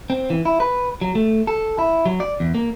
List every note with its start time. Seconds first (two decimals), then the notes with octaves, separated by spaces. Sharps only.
0.10 C4
0.30 E3
0.45 E4
0.60 B4
1.01 F#3
1.15 A3
1.47 A4
1.79 E4
2.06 F#3
2.20 D5
2.40 E2
2.55 A#3